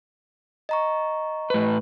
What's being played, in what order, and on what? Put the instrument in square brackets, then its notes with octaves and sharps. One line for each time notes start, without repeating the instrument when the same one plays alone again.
[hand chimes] D#5 A#5 C#6
[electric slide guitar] A2 B4